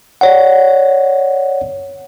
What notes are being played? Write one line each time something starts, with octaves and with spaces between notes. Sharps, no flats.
C#5 D5 F#5